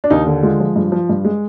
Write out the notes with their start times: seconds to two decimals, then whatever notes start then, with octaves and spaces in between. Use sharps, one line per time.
0.04 D4
0.10 D#2 D#4
0.27 D3
0.43 G#3 F4
0.60 F3
0.76 G2
0.92 F3
1.09 G2
1.25 G#3